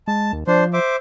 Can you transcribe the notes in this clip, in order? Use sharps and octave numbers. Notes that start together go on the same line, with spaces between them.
G#3 A5
D#2
F3 D4 C5
C5 E5 D6